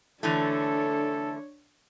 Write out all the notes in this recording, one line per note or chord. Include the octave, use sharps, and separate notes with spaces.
D3 E3 A3 D4 A4 C#5